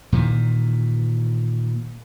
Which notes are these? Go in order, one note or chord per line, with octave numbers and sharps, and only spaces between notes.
A#2 D#3 E3